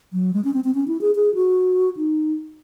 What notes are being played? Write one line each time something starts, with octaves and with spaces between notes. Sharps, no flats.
F#3
G#3
C#4
C4
C4
C#4
E4
G#4
G#4
F#4
D#4